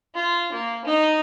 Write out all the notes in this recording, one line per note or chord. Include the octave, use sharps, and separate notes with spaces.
F4
A#3
D#4